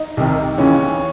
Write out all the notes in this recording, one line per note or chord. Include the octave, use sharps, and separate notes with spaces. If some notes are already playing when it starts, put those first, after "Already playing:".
Already playing: D#4
C2 C3 D#3
D#2 C#3 E3 C#4